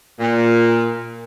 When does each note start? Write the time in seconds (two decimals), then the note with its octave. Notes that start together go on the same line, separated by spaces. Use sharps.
0.20 A#2